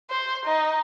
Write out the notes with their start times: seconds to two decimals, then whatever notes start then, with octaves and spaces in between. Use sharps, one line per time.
0.10 C5
0.46 D#4